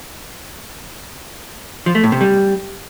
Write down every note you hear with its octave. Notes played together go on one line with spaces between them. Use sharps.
F3
A3
A2
C3
G3